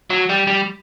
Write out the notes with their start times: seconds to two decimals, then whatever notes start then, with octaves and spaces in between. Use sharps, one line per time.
0.10 F#3
0.29 G3
0.47 G3